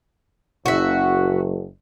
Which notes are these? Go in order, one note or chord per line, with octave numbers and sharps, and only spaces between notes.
F#1 F#4 E5